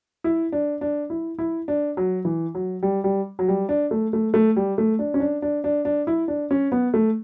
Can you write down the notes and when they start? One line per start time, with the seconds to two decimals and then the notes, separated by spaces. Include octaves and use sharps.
0.24 E4
0.52 D4
0.81 D4
1.10 E4
1.39 E4
1.68 D4
1.97 F#3
2.25 E3
2.55 F#3
2.83 G3
3.04 G3
3.39 F#3
3.48 G3
3.69 D4
3.91 A3
4.13 A3
4.34 A3
4.56 G3
4.78 A3
4.99 D4
5.14 C#4
5.20 D4
5.42 D4
5.64 D4
5.85 D4
6.07 E4
6.28 D4
6.51 C#4
6.72 B3
6.94 A3